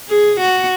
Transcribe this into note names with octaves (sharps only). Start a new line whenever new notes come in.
G#4
F#4